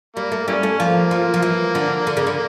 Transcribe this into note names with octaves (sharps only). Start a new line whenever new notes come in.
G3 A#3
A3
E3 G3 A#3 C#4
A3
F3 A#3
F3
F3
E3
D3
D3
C#3
D3